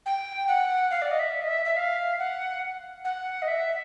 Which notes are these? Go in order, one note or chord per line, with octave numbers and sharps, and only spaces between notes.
G5
F#5
F5
D5
D#5
E5
D#5
E5
E5
F5
F#5
F#5
D#5
E5